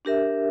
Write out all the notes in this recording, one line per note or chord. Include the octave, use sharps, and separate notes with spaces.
D4 G4 A#4 E5